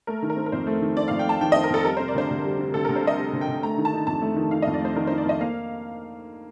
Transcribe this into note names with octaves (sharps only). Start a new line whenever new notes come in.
A3 A#4
D#3
A#4
C4
A#4
F2 C5
A3
D#3
C4 D5
F2 F5
G5
A3 A5
D#3 G5
C4 D#5
A#4
F2 A4
G3 A#4
C3 C5
D5
D2 C5
D2
G3
C3
D2 A4
D2 A#4
C5
G3 D#5
C3
D2
G5
D2
A3 A#5
D#3
A5
D#4
F2 A5
A3
D#3
D#4 F5
F2 D#5
D5
A3 C5
D#3 A#4
D#4 C5
D5
F2 D#5
A#3 F5